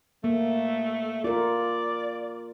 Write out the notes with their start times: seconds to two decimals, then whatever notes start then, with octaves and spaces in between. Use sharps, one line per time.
0.24 A3 A#3
1.24 F4 A#4 D5